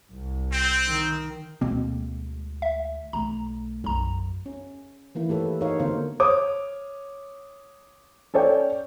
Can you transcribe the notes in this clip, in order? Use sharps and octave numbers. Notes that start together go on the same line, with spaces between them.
C2
C4
D#3
D2 B2 G#3 A#3 C4
E5
B1 A3 A#5
B1 F#2 A#5
C#4
D#3 E3 A#3 E4
A3 G4 A4 B4 C#5
D#4 F#4 A#4 C#5 F5
D3 A#3 B3 C5 F5
C#5 D6 D#6
C#4 A4 C#5 D5 G5